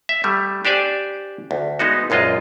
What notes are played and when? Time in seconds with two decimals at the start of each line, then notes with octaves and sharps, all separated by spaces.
0.09 E5
0.24 G3 A3
0.65 D4 G4 C5 D5 G#5
1.51 D2
1.79 G#3 B3 D#4 F#4
2.10 A#1 F#2 G#3 F4 D#5